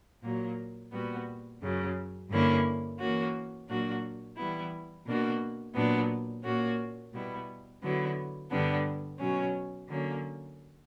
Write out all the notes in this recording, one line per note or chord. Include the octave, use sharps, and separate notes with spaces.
A#2 F#3 A#3
A#2 G3 B3 F#4
F#2 C#3 F#3
G2 D3 A#3 C#4 E4
E3 A#3 C#4 F#4
A#2 F#3 A#3 D4 F#4
E3 G3 B3 E4
B2 A#3 D4 F#4
A#2 F#3 B3 D4
A#2 A#3 C#4 F#4
B2 G3 B3 E4
D3 F#3 B3 E4
G2 D3 G3 B3 D4
B2 F#3 C#4
D3 F#3 A#3 C#4